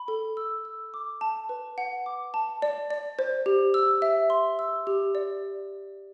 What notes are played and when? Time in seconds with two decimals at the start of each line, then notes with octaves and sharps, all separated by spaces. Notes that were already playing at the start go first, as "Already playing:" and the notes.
Already playing: B5
0.08 A4
0.37 E6
0.65 E6
0.94 D6
1.21 A5
1.49 B4
1.78 F#5
2.06 D6
2.34 A5
2.62 D5
2.91 D5
3.19 C5
3.46 G4
3.74 E6
4.02 E5
4.30 C6
4.59 E6
4.87 G4
5.15 D5